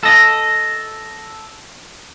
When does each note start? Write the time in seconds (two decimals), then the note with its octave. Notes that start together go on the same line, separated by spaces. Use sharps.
0.03 A4 D#5